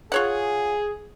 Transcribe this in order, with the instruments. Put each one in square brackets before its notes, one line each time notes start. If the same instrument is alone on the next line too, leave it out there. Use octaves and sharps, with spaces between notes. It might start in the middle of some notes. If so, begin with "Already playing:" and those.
[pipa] F4 C#5 F#5 [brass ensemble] G#4